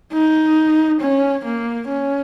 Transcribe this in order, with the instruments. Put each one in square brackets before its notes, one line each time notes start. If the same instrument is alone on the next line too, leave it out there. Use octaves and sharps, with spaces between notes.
[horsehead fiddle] D#4
C#4
A#3
C#4